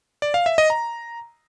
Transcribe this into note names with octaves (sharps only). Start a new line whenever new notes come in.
D5
F5
E5
D#5
A#5